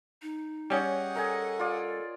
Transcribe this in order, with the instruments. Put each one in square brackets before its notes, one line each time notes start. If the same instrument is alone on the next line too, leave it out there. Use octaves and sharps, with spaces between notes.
[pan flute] D#4
[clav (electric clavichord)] G3 C#4 [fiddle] G#4 F#5 [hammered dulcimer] C#5 D#5 G5
[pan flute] A4 [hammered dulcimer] A#4 D#5 G#5
[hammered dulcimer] F4 D5